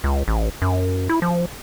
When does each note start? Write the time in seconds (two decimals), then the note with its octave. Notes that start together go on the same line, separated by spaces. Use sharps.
0.04 C#2
0.28 A1
0.62 F#2
1.09 E4
1.22 F3